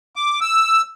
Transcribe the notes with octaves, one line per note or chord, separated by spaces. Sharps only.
D6
E6